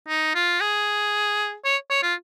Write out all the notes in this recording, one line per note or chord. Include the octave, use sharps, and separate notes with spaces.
D#4
F4
G#4
C#5
C#5
F4